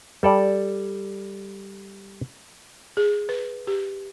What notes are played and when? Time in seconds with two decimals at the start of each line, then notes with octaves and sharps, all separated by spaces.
0.23 G3 A4 D5
2.97 G#4
3.29 B4
3.67 G4